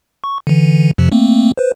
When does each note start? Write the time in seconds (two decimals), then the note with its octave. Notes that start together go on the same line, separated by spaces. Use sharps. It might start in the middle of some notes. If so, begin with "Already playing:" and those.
0.24 C#6
0.47 D3 E3
0.98 F2 C3 F3
1.12 A3 A#3 C4
1.57 B4 C5